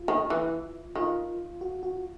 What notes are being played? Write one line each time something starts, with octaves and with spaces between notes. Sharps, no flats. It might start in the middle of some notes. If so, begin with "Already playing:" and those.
Already playing: F4
D#3
E3
D#3 F4
F#4
F#4